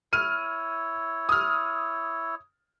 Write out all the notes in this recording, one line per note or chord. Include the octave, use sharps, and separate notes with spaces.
E4 C#5 F6 D#7
D#6 F6